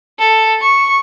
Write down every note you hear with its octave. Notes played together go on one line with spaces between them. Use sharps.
A4
C#6